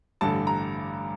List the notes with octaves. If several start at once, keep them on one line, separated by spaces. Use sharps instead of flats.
A1 G2 D3 A5
A#5